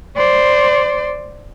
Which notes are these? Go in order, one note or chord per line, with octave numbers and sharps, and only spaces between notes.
C5 D5